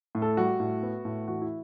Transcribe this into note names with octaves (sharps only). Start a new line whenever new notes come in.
A2
A4
G3 F#4
A2
B3
A2
E3 F#4
E4